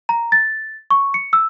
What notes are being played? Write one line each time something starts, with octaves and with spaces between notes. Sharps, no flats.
A#5
A6
C#6
C#7
E6